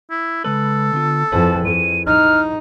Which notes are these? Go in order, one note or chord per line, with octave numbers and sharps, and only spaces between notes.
E4
C#3 G#3 A4 B4
D3 B3 F4
F2 E4 G#4 B4 A5
F2 D#7
D#4 F6